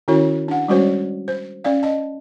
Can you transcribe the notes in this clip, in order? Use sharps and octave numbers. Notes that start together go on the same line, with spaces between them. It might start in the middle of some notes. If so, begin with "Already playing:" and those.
D#3 C#4 E4 F#4 C#5
D4 F#5
G3 G#3 C#4 F#4 C5 C#5
C5
C#4 D5 F5
D#5 A5